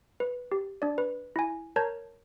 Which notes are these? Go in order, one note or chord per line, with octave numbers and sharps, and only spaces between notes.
B4
G4
D4 D5
B4
E4 G#5
A#4 C#5 A5 A#5 G6 G#6